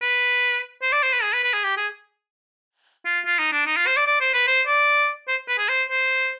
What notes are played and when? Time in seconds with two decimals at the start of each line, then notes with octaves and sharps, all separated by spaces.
0.02 B4
0.82 C5
0.92 D5
1.03 C5
1.13 B4
1.23 G#4
1.33 B4
1.43 B4
1.53 G#4
1.64 G4
1.77 G#4
3.06 F4
3.26 F4
3.39 D#4
3.53 D4
3.67 D#4
3.76 F4
3.87 C5
3.97 D5
4.07 D5
4.20 C5
4.34 B4
4.47 C5
4.67 D5
5.28 C5
5.48 B4
5.58 G#4
5.69 C5
5.89 C5